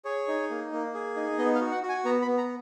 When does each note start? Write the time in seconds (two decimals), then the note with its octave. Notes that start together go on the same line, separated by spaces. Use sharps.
0.05 G#4 C#5
0.28 D#4
0.50 A#3
0.72 A#3
0.94 G#4
1.16 D#4
1.38 B3 D#5
1.55 F5
1.60 F#4
1.71 F#5
1.83 F#4
1.89 G#5
2.05 B3 A#5
2.22 B5
2.27 B3
2.38 A#5